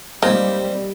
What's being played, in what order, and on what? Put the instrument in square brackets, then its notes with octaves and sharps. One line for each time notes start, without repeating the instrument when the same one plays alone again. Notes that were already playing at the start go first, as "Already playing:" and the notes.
[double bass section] G3 [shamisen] A#3 D#4 F4 [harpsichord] C4